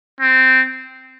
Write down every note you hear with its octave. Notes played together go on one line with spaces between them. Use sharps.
C4